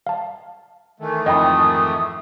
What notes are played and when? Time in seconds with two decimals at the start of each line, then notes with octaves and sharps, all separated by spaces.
0.07 F5 A5
1.00 D#3 E3 A3
1.26 F2 G#2 D#5 G5 B5 D#6